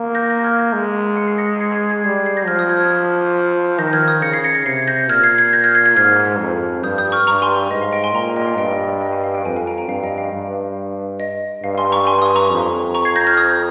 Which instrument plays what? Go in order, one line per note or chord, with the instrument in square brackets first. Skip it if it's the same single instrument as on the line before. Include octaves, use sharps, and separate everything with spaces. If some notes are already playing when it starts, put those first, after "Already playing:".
Already playing: [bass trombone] A#3
[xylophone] G6 A#6
G6 A#6
F6 G#6
G6 A#6
[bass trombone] G#3
[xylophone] C#7
C7
A#6 C#7
G#6 C7
G#6 C7
G#6 C7
[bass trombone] G3 [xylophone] G#6 C7
[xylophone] G#6 C7
G6 A#6
[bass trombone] F3 [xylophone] F6 G#6
[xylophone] D#6 G6
F6 G#6
F6 G#6
[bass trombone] D#3 [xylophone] G6 A#6
[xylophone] F6 G#6
D#6 G6
[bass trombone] C#3 [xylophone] A#6 C#7
[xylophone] G#6 C7
A#6 C#7
A#6 C#7
[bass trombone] C3 [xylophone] G#6 C7
[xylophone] G6 A#6
[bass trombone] A#2 [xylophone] F6 G#6
[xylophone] G#6 C7
G#6 C7
G6 A#6
F6 G#6
G#6 C7
G#6 C7
[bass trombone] G#2 [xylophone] F6 G#6
[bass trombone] F2
[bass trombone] G2 [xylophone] D#6 G6
[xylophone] D#6 G6
C#6 F6
[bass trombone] G2 [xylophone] A#5 C#6
[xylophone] G#5 C6
[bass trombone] G#2 [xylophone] D#5
[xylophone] F5
D#5 G5
G#5 C6
[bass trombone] A#2 [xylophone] G5 A#5
[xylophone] D#5 G5
F5
[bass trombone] G2 [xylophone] D#5 G5
[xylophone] D#5 G5
F5 G#5
F5
D#5 G5
[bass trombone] F2 [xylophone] F5 G#5
[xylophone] F5 G#5
G5 A#5
G5 A#5
[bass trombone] G2 [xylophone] F5
[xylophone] D#5 G5
F5
[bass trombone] G2
[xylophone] D#5
[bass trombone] G2 [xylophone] F5
[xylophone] G#5 C6
A#5 C#6
G#5 C6
C6 D#6
A#5 C#6
[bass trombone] F2
[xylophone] A#5 C#6
G#6 C7
G6 A#6
F6 G#6
D#6 G6